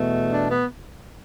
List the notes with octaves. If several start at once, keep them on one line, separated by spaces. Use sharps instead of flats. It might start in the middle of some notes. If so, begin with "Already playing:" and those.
Already playing: E2 B2 A3
D4
B3